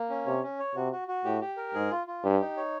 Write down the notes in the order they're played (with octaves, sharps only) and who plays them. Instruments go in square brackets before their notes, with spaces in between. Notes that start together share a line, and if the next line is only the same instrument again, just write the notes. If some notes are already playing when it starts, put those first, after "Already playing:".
Already playing: [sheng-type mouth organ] A#3
C#4
[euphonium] C3 [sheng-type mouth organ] C#5
[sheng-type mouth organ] C#4
C#5
[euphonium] C3 [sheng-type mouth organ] F#4
[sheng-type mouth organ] F#4
F#4
[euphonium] A2 [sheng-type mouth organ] G4
[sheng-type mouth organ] G4
A#4
[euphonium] G#2 [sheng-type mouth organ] G#4
[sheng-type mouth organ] F4
F4
[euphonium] G2 [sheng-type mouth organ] G4
[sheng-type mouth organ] D#4
C#5